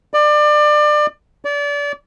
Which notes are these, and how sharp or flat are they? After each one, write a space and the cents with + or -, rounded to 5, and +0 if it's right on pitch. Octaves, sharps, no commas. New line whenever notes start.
D5 +25
D5 -30